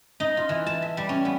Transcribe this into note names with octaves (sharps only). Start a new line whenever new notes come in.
D#4
F4
E3
A5
E5
G3
C#4
B3